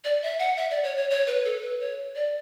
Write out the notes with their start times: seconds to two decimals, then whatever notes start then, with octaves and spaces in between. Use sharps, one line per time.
0.04 D5
0.23 E5
0.39 F#5
0.57 E5
0.71 D5
0.84 C#5
0.97 C#5
1.10 C#5
1.27 B4
1.45 A4
1.62 B4
1.81 C#5
2.15 D5